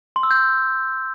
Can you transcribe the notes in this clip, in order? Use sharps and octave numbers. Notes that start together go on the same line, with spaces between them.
C6
E6
G6